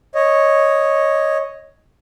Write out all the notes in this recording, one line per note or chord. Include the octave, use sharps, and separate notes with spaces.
C#5 D#5